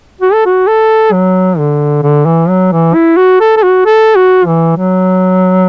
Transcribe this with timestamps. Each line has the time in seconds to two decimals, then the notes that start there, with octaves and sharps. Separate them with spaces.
0.21 F#4
0.33 A4
0.46 F#4
0.67 A4
1.12 F#3
1.58 D3
2.03 D3
2.26 E3
2.49 F#3
2.72 E3
2.94 E4
3.17 F#4
3.41 A4
3.57 A4
3.63 F#4
3.86 A4
4.16 F#4
4.46 E3
4.76 F#3